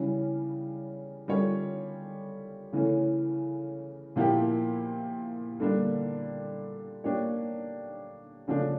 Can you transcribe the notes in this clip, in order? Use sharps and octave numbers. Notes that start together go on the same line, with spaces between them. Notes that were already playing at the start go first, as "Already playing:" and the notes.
Already playing: C#3 E3 G3 C#4
D3 G3 C#4 F4 C#5
C#3 E3 A3 C#4
A#2 F3 A#3 E4 G4
D3 G3 A#3 D4
A#3 D4 G4 C#5
C#3 F3 A3 D4